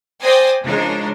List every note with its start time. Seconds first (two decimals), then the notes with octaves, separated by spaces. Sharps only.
0.22 C5 D5 G5 G#5 D#6 A#6
0.63 C#3 F3 G#3 D4 D#4 A#4